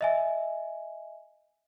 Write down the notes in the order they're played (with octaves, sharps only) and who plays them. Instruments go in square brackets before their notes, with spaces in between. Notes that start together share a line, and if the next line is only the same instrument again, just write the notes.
[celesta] D#5 E5 G#5